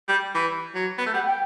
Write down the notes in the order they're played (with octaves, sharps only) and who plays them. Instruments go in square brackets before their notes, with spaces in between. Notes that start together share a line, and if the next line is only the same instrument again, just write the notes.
[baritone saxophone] G3
E3
F#3
B3
A3
[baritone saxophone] G3 [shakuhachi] F#5
[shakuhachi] G5